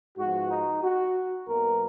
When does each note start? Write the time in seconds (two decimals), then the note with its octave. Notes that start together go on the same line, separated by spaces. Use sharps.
0.18 G#2 F3 B3 F#4
0.51 D#4
0.83 F#4
1.48 B1 B2 F#3 A#3 A#4